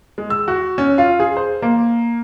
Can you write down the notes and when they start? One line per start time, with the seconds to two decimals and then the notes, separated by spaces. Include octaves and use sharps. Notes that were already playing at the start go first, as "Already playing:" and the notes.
0.18 G#3
0.30 E6
0.48 F#4
0.78 C#4
0.98 F4
1.20 G#4
1.37 C5
1.62 A#3